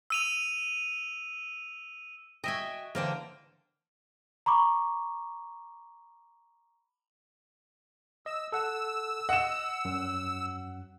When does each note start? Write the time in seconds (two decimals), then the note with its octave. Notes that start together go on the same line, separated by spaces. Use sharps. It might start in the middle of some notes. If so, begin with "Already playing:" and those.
0.10 E6 D#7 F7
2.44 F#4 D#5 E5 G5 G#5
2.95 D3 E3 A#3 C5 G5
4.46 A#5 B5 C#6 D6
8.26 D#5 E6
8.52 A4 F#5 E6
9.29 D#5 F#5 E7
9.85 F#2